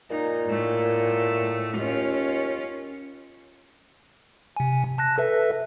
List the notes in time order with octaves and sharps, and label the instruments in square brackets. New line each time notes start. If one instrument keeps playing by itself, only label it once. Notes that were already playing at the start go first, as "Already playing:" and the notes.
[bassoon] A#2 [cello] D#4
[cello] A2 A3
[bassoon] D#2 [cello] C#4 F4
[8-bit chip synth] C3 G#5
A5 F#6 A#6
A4 B4 E5